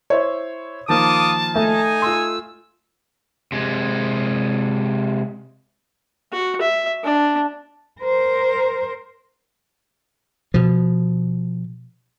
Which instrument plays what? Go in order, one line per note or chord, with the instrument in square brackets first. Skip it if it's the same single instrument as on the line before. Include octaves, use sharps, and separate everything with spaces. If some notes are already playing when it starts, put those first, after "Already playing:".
[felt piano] E4 C5 C#5
[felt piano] D#3 F3 A#3 [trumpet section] F4 D6 D#6 [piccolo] A5
[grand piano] A3 [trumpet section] D#4 G#5
[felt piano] F4 C6 [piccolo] E6
[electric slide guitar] C3 G#3
[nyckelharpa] F#4
E5
D4
[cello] A#4 C5
[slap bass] B2 F3